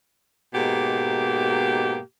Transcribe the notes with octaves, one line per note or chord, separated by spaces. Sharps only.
G#2 B2 A#3 G4